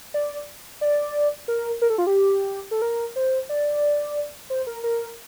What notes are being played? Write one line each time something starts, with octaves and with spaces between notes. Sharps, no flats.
D5
D5
A#4
A#4
A4
F4
G4
A4
A#4
C5
D5
C5
A#4
A#4